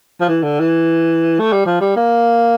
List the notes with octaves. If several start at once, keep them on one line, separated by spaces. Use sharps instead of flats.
F3
E3
D3
E3
A3
G3
F3
G3
A#3